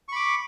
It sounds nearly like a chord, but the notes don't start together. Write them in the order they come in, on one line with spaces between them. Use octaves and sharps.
C#6 B5 D6